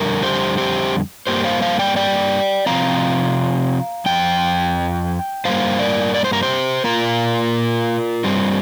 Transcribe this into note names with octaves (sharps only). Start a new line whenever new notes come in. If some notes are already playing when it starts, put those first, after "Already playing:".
Already playing: F2 D3 G3 A#4
G4 C5
G4 C5
G2 G3 A#3 G4 C5
C5 F5
C5 F5
D5 G5
D5 G5
C3 F3 C4 F5 A#5
F2 F3 G5
G2 G3 A#3 C5 F5
A#4 D5
D5
C5
A#4
G4 C5
A#2 A#3 F4 A#4
G2 G3 C4